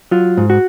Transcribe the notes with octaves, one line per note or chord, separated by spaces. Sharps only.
F#3 F4
G#2
F#4